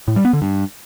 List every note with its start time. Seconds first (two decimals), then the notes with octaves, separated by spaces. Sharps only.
0.08 A2
0.16 G3
0.25 B3
0.33 D3
0.42 G2